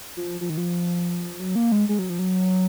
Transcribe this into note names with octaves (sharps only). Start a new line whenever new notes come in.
F3
F3
D#3
F3
F#3
A#3
G#3
G#3
F#3
F3
F#3